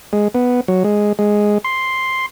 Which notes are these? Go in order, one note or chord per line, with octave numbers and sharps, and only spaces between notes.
G#3
B3
F#3
G#3
G#3
C6